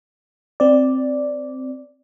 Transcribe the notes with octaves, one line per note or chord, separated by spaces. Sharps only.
C4 D5